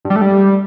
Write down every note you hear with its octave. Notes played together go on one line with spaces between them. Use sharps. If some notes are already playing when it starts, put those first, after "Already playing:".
G2
G3
A3
G3